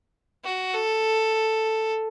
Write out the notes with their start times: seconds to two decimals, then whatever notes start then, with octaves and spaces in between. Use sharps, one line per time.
0.44 F#4
0.74 A4